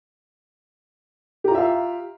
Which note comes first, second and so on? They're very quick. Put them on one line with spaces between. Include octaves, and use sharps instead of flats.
G4 A#5 F4 E5 F5